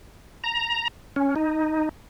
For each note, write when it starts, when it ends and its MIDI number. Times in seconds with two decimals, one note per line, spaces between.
0.44 0.88 82
1.16 1.35 61
1.36 1.89 63